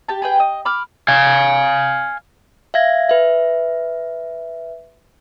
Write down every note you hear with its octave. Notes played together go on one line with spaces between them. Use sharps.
G4 A5
G#4 B4 G5
D#5
B5 D6 F6
F5 G#5
E5 F5 G#6 A#6
B4 E5